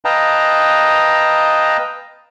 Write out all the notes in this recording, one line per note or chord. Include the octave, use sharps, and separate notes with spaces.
B4 D#5 F5 G5 A5 A#5